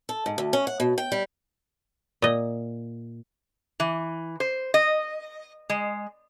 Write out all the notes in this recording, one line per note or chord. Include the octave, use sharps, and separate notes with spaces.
A4
G#2
D2
C#4
F#5
B2
G5
G3
A#2 D#5
E3
C5
D#5
G#3